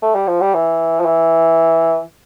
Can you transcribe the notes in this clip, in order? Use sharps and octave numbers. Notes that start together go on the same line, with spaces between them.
A3
G3
F3
G3
E3
F3
E3